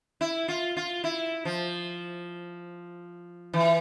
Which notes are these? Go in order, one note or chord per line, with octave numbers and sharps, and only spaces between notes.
E4
F4
F4
E4
F3
E3